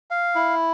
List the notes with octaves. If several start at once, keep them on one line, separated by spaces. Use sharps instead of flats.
F5
E4